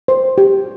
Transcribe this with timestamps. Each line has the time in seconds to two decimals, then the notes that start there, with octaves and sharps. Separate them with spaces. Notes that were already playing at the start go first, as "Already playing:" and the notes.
0.08 C5
0.38 G4